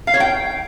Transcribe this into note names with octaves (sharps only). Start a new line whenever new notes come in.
F5
C#5
G5